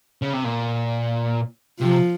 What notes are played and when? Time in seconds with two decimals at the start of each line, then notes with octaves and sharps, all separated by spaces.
0.22 C#3
0.33 C3
0.44 A#2
1.80 C3 F3